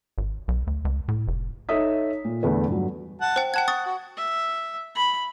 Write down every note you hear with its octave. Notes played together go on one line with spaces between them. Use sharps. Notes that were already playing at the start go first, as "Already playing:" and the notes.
G#1
B1
D2
C#2
A2
F1
D#4 A4 C#5 E5 D#6 B6
A#2
E2 D3 A3 B4
G2 F#3
F#5 A5
C5 G5
F#5 G5 A5 G#6
C#6 D#6 A6
F#4
E5
B5